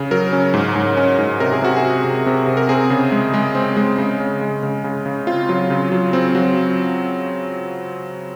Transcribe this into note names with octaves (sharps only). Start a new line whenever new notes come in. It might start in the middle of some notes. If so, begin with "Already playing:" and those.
Already playing: C#3
F#3 A#4
C#4
G#2
G#2
C#4
G#2
C3 A#4
G#4
C3 F#4
G#4
C4
C3
C3
C3
A#4
C4 G#4
C#3
G#3
G#3
C4
G#3
C#3
C#3
G#3
C#3
C#3
C#3
C4 F4
F#3
C#3
F#3
C4
F#3